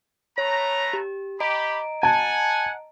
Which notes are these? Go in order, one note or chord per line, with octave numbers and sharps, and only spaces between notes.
A3 B4 C#5 A#5
G4
G4 D#5 A#5 B5 D7
F#5 G#5 A5